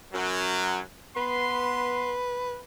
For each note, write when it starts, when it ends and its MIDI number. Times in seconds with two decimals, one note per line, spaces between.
0.14 0.82 42
0.14 0.82 54
1.17 2.14 59
1.17 2.59 71
1.17 2.14 84